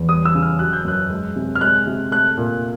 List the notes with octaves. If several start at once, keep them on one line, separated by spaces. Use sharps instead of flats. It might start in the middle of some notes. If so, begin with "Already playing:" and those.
Already playing: E2
G3 D#6
E6
C#3
F6
F#3 F#6
G6
F#2 F#6
G#3
C3
F6
G#3 F#6
C3
A3 F#6
A#2